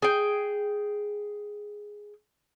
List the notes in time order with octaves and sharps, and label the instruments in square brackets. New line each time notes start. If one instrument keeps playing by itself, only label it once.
[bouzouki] G#4 G5